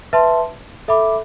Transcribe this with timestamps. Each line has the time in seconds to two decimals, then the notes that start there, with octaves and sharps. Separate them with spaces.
0.13 B4 E5 A5 C6
0.88 A4 E5 B5 D6